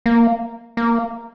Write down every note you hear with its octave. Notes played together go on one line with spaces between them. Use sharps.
A#3
A#3